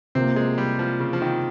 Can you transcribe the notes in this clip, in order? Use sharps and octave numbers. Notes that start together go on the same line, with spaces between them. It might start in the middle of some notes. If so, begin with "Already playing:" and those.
C3 F3 A#3 C4
G#3
G3
F3
C#3
F3
D#3